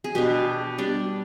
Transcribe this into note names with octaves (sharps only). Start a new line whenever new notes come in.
G#4
B2 B3 D4 G4
G3 D4